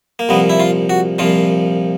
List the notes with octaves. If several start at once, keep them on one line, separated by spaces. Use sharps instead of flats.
A#3
C2 A#2 F3 B3
E4
F4
F#4
C2 A#2 F3 F4